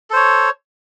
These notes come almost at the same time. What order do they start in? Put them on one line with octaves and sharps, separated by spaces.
A4 C5 C#5